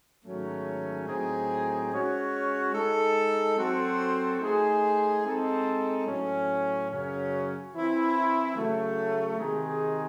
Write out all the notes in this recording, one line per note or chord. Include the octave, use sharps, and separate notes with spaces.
G#2 D#3 F#3 A3 C#4
A2 F#3 C4 D#4 G#4
G#3 C#4 F#4 C#5
G#3 D#4 A4
F#3 C4 F#4 A4 C5
A3 D#4 G#4 C5
G#3 C4 D#4 A4
A2 F#3 C#4
F#2 C#3 F#3 C#4
E3 C4 E4 C5
C#3 F#3 A3
C3 D#3 G#3 D#4 G#4